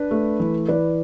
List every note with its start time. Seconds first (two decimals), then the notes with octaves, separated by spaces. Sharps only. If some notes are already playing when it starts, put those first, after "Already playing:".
Already playing: D4 B4
0.11 A3
0.40 E3
0.68 E3 B4 D5